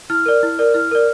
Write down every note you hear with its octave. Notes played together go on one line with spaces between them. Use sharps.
E4 F6
A#4 D5
E4
A#4 D5
E4 F6
A#4 D5